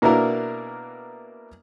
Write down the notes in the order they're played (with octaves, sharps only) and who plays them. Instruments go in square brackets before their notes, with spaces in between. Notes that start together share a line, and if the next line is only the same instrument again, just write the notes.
[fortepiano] B2 A#3 B3 D4 E4 A#4